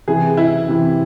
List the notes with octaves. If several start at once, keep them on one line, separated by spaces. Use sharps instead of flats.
C3 E3 G#4
E4
C3 E3